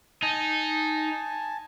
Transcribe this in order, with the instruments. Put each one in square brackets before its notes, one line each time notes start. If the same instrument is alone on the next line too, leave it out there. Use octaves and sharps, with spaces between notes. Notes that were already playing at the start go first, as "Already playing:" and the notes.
[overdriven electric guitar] D#4 [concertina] G#5 A5